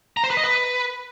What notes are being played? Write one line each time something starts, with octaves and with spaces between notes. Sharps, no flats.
A#5
C5
B4
D#5
B4